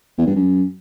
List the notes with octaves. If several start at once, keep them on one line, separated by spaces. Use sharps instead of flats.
E2
G2
F#2